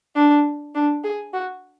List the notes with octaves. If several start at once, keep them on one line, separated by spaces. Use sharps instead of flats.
D4
D4
G#4
F#4